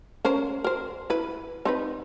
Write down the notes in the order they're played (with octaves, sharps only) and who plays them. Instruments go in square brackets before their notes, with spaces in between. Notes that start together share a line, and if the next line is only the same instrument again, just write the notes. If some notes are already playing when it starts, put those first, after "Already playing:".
[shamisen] C#4 A#4 C5
A#4 C5
E4 B4
C4 D#4 B4